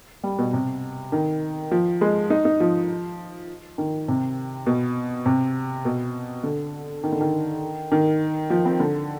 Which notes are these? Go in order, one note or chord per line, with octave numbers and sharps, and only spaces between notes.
G3
B2
C3
D#3
F3
G#3
D#4
D#4
F3
D#3
C3
B2
C3
B2
D3
D#3
D3
D#3
D#3
F3
C4
D3